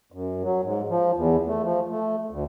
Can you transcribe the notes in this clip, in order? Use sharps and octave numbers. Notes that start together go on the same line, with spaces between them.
F#2
F#3
G#2
F3
E2
A3
F3
A3
D2